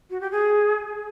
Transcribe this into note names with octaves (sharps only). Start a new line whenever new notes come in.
F#4
G4
G#4